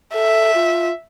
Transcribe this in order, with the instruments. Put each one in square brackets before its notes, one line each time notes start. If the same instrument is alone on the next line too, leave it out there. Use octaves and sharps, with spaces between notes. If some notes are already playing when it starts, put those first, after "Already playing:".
[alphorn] A4 [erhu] E5
[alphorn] F4